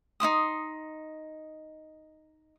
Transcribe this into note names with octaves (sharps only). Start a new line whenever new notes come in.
D#4 E4 C6 D#6